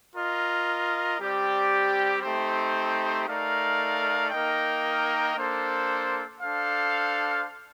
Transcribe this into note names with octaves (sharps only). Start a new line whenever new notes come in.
F4 A#4 D#5
G3 C4 G4 D5
A3 C4 D#4 G4 C5
A3 D#4 A#4 D5 F5
A#3 D#4 A#4 D#5 G5
A#3 D4 A4 C5
D4 A4 C5 F5